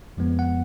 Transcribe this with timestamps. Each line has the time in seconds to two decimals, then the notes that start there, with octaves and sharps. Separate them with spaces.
0.17 F2 F3 G#3 B3
0.39 F#5